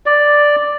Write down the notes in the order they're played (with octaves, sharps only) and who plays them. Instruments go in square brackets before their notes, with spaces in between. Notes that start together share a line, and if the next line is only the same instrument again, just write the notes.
[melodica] D5